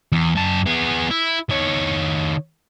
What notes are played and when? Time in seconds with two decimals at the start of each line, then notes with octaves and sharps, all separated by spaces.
0.12 E2
0.35 F#2 A5
0.66 B3 G#4
1.10 E4
1.50 D#3 C#5